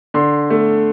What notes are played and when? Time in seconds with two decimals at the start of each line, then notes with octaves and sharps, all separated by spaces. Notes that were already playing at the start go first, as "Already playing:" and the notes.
0.14 D3 C6
0.50 A3